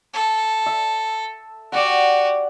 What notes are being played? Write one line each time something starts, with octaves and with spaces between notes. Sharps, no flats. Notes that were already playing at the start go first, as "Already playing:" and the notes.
A4
E5
F#4 G4 D5 F#5